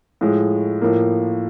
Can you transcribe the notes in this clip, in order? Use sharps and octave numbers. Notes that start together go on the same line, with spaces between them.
A2 F3 G#3
A2 F3 A#3